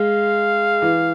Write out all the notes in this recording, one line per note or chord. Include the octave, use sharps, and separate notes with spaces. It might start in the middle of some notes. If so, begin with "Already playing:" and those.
Already playing: G#3 F5
E3